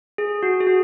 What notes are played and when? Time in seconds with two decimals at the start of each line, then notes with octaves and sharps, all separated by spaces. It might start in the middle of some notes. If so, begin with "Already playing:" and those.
0.18 G#4
0.43 F#4
0.61 G#4
0.67 F#4